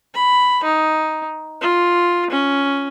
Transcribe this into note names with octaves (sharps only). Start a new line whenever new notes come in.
B5
D#4
F4
C#4